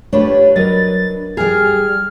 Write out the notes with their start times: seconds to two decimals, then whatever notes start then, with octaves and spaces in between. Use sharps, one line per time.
0.13 A3 D4 F4 G4 B4 C#5
0.56 F#3 A#4 D#5 A6
1.37 G3 G#4 F6